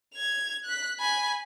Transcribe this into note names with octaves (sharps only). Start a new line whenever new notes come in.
G#6 F7
F#6 B6
G#5 B5